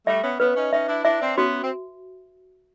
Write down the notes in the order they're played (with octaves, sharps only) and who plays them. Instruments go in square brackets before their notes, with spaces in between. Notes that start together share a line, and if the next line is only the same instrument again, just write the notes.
[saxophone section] G3 A3 [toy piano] E5
[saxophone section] B3 C#4
[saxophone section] B3 C#4 [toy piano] B4
[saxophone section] C#4 D#4
[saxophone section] C#4 D#4 [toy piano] E5
[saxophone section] D4 E4
[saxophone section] D4 E4 [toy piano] E5
[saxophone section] C4 D4
[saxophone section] B3 C#4 [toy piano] F#4
[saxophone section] C4